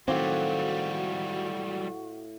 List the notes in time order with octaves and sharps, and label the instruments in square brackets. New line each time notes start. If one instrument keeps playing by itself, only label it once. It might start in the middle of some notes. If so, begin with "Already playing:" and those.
[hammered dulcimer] A2 F5 D6 [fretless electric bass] D#3 C4 [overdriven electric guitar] F#3 G3 [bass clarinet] F#4